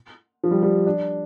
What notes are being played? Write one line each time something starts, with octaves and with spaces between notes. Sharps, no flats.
F3
G3
G3
D4